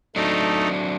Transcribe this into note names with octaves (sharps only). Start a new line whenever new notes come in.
F#3 A3 C4 D4 D#4